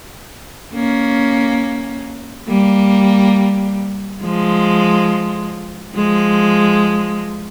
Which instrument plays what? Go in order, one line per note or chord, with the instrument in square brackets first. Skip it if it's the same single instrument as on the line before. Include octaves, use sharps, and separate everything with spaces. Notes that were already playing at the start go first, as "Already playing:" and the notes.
[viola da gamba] A#3 C#4
G3 A#3
F3 G#3
F3 G#3